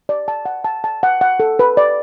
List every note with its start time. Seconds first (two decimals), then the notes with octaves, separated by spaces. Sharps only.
0.09 D5
0.28 A5
0.46 F#5
0.65 A5
0.84 A5
1.03 F#5
1.21 F#5
1.40 A4
1.59 B4
1.77 D5